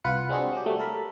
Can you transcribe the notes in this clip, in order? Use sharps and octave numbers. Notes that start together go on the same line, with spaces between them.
C2 F4 B4 F#5 C#7
G#3 C4 D4 F#4 G#4
F#3 F#4 G4
F#3 G3 A3
A4 A#4 B5